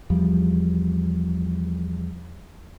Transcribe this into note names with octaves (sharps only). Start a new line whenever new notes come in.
E2 F3 G3